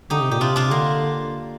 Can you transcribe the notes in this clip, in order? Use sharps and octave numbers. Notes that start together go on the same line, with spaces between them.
D3 D#4 G4
C3
A#2 G4
C3 D4 F4
D4 F4
D3 A#3